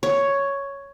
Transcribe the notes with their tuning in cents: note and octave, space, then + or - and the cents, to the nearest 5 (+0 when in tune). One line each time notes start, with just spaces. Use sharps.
C#5 +5